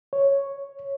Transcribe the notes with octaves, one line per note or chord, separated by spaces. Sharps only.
C#5